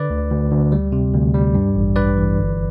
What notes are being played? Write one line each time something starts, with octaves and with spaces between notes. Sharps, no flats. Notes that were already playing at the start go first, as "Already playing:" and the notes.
Already playing: D3 B4 D5
D2
D2
D2
G3
C3
D2
G3
G2
A1
G2 B4 D5
E3
G1